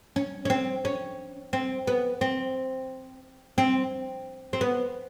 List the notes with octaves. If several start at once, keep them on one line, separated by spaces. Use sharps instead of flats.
C#4
C#4
C4
C#4
C4
B3
C4
C4
C4
B3